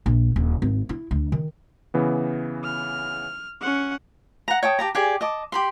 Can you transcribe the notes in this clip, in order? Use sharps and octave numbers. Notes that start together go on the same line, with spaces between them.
A#1
D#1
G#1
E4
D2
D#3
C#3 E3 B3
F6
C#4 F#5
F#5 A#5
C#5 G5 A5 D#6
G4 A5 A#5
G4 G#4 D5 G#5
D#5 A5 D6
G4 B5 C6